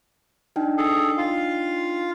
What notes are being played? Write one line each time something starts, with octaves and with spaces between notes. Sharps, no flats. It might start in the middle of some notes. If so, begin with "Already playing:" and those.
D4 D#4 G5
G#4 A4
F4 F5